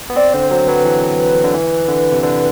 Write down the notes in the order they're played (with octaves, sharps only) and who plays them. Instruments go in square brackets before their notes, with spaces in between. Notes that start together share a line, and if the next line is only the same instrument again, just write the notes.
[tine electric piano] B3
[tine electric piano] C4 [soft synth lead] D5
[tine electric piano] D3 [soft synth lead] C5
[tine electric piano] F#3 [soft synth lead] C5
[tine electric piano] F#3 [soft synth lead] B4
[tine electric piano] E3
D3
E3
D3
C3
[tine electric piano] D3 [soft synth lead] B4